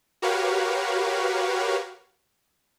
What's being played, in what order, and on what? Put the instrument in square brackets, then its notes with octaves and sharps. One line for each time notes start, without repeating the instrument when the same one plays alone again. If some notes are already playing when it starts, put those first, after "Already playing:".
[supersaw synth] F#4 G4 A#4 B4 C#5 F5